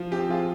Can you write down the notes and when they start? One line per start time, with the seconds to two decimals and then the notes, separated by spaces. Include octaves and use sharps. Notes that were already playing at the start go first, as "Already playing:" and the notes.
Already playing: F3
0.11 C4 G4
0.29 F3 F4 G#4